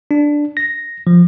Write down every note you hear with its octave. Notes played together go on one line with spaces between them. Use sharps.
D4
A#6
F3